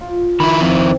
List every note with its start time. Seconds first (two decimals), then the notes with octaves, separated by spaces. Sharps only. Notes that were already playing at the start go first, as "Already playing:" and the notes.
0.01 F4
0.40 D#3 E4 B5
0.61 F2 C4